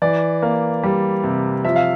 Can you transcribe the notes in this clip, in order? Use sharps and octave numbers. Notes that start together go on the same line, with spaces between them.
E3 D5
A#3
G3
C3
F3 E5
F5